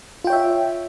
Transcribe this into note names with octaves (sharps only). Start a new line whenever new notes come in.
F4 C#5 E5 G5